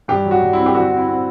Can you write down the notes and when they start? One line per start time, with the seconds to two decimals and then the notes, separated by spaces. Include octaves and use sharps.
0.08 G2 G4
0.25 F#3
0.31 F#4
0.42 G2
0.53 C4 E4
0.66 G4
0.75 D3 F#4
0.91 C4
0.97 E4
1.08 C4